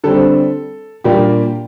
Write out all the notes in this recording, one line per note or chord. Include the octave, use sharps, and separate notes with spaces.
D3 G3 C4 A4
A#2 G3 A#3 D4 G4